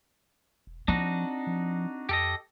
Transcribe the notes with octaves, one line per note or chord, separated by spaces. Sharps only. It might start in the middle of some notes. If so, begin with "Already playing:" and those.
E1
F3 C4 D4 D#4 F#4
F3
F2 G4 A4 D#5